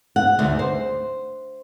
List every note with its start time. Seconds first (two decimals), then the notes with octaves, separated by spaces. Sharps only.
0.16 F#5
0.39 D2
0.59 C5